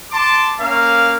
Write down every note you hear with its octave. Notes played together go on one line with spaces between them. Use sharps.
A5 C6 D6
A#3 C#4 F5